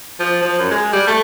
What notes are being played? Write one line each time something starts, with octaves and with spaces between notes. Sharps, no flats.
F3
F3
F#2
G#3
G3
A3